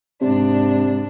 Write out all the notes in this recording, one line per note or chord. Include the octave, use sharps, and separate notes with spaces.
G#2 C3 D4